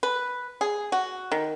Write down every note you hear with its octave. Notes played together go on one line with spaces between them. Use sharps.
B4
G#4
F#4
D#3